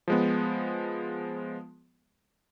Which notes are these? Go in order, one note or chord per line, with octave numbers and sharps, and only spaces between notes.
F3 G#3 B3